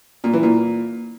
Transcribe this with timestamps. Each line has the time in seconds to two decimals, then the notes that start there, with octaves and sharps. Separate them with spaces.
0.24 A#2
0.33 E3
0.43 A#2